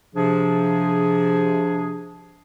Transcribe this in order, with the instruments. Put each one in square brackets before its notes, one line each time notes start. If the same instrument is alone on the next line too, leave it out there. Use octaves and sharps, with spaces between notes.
[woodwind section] C3 F3 D4 G#4